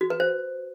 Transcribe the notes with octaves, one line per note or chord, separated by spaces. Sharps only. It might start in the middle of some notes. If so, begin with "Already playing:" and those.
F#4
B4
C5